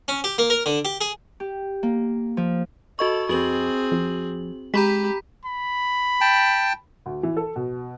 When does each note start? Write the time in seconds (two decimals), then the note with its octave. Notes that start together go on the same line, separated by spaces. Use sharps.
0.08 C#4
0.24 G4
0.38 A#3
0.50 A#4
0.66 D3
0.85 G4
1.01 G#4
1.40 G4
1.83 A#3
2.37 F3
2.99 F#4 A4 D#5 C#6
3.29 F2 C4 F#4 G#4 F#7
3.91 F2
4.74 G#3 G4 A#5 B5 B6
5.45 B5
6.21 G5 A5
7.06 D2
7.23 E3
7.37 A4
7.56 B2